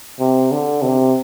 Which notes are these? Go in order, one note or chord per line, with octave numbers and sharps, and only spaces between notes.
C3
D3
C3